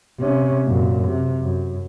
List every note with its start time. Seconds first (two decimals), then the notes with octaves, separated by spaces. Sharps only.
0.19 C3 C#4
0.65 F#2 A#2
1.07 C3
1.42 F#2